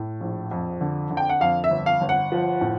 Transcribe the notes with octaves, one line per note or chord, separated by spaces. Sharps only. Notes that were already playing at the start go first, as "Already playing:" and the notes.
Already playing: A2
A#1
F2
D3
D3
G5
F#5
F2 F5
E5
G1
F5
G1
F#5
F3
A2